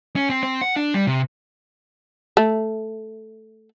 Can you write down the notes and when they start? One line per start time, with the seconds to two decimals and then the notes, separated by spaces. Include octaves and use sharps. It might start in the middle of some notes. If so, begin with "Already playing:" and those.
0.16 C#4
0.30 C4
0.43 C4
0.61 F#5
0.76 D4
0.94 G3
1.07 C3
2.37 A3